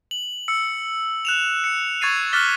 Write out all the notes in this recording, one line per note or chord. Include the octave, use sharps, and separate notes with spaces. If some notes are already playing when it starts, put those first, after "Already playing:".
F#7
E6 C#7
F#6 E7 F7
C#7
C#6 G#6 A6 C7 D#7
D6 F6 F#6 A6 B6 G7